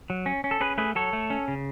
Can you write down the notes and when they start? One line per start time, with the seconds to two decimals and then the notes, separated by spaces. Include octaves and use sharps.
0.10 F#3
0.26 C#4
0.44 C#4
0.51 A4
0.61 C#4 G#4 B4
0.78 A3 G#4 B4
0.95 F#3 A4 C#5
1.13 A3
1.30 C#4
1.48 C#3